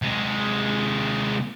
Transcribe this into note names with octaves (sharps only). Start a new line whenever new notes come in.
C3 G#3